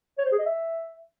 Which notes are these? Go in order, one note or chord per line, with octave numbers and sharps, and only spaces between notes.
C#5
C5
G#4
D#5
E5